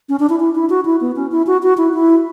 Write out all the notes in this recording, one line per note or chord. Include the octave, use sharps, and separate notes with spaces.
C#4
D4
E4
E4
E4
F#4
E4
B3
C#4
E4
F#4
F#4
E4
E4